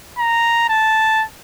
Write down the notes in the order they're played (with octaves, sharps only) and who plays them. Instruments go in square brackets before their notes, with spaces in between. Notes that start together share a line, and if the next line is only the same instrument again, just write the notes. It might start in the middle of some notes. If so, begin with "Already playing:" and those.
[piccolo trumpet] A#5
A5